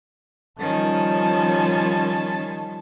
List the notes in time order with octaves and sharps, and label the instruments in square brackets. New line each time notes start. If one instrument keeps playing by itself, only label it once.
[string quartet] D#3 C#4 [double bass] F3 G3 [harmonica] A5